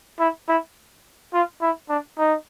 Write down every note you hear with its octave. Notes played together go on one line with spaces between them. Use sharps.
E4
E4
F4
E4
D4
D#4